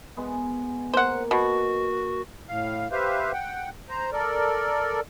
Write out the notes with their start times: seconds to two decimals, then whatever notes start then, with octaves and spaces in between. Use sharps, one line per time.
0.17 G#3 B3
0.94 A#3 C5 F#5
1.31 B2 F#4
2.48 A2 F5
2.92 G4 B4 C5 E5 F5
3.32 F#5 G5
3.89 C5 A#5
4.13 A4 A#4 D5